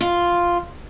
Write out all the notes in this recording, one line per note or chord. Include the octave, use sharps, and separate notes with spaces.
F4